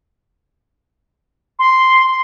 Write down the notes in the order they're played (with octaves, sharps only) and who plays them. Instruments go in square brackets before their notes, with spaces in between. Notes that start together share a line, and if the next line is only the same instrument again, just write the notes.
[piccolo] C6